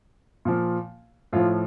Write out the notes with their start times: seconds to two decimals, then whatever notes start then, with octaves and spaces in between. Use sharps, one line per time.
0.45 A#2 F3
1.33 A2 F3 F4